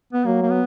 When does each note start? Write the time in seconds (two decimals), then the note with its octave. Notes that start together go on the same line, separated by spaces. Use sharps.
0.13 B3
0.25 F#3 A#3
0.42 A#3
0.50 B3